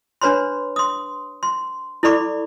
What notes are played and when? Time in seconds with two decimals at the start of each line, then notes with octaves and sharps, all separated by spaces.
0.22 D4 B4 C#5 B5 C6
0.76 C6 D#6
1.43 C6
2.03 E4 A4 D5 B5 C#6 D6